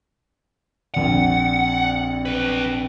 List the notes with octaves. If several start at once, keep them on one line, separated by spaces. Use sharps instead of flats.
A#1 F2 D5 F#5
B1 B4